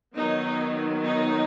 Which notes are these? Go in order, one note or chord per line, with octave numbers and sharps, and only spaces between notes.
D#3 F#3 B3 D#4
D#4